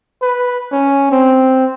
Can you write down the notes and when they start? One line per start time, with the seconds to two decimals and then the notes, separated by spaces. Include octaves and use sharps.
0.22 B4
0.72 C#4
1.12 C4